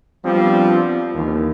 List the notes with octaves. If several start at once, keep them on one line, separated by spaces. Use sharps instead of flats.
F3 G3 B3 C4 D4 F4
D#2 E3